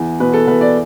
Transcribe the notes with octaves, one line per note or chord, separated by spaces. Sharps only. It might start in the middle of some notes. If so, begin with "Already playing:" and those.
Already playing: E2
B2 B4
A4
E2 B4
D5